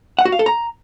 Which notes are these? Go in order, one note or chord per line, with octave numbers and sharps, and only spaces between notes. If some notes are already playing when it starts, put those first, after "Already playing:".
F#5
F#4
F5
A4
A#5